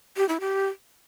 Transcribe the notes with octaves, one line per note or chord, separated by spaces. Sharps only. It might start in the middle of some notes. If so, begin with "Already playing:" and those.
G4
E4
G4